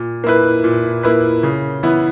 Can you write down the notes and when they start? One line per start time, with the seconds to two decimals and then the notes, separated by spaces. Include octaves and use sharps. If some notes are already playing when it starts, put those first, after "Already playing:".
Already playing: A#2
0.24 A#3 E4 B4
0.64 A#2
1.03 A#3 E4 B4
1.43 C#3
1.83 E3 B3 E4